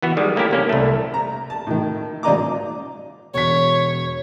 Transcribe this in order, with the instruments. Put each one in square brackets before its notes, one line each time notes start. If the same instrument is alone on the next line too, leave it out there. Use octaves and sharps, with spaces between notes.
[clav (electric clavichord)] E3 B3 F#4
D#3 G3 G#3
A3 A#3 C#4 E4 G4
C3 A#3 C#4
C2 A3
[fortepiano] A#5
A5
A2 D#3
G#1 C#4 D5 D#5 A#5 D6
[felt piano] E1 B6 [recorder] C#5